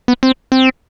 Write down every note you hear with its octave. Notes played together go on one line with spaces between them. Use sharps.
B3
C4
C4